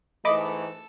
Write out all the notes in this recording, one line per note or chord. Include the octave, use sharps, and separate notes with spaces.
G#2 E3 A3 A4 D#5 B5 D6